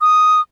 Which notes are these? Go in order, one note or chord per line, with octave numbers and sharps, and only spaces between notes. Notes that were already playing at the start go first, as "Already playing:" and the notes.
D#6